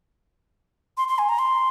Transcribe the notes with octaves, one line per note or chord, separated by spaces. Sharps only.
C6
C6
G#5
A#5
C6